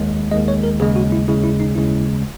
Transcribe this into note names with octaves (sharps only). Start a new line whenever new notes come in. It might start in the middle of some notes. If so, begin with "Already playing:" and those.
Already playing: D#2 D#3 G#3
D#2 D#3 G#3 D#5
C#5
A#4
D#2 C#3 G#3 G#4
F#4
E4
D#2 C#3 G#3 E4
E4
D#4
D#2 C#3 G#3 E4